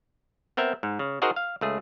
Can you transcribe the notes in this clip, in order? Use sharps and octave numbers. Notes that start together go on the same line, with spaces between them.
B3 C4 A#4 E5
G#2
C#3
D#4 F#4 G#4 A#4 C5 F#5
F5
C#2 A3 G#4